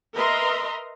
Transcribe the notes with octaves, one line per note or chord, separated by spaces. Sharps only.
A#4 B4 D#5 E5 A#5 C6